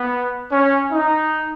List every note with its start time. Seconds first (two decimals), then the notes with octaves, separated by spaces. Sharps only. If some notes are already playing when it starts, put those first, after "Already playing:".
Already playing: B3
0.52 C#4
0.92 D#4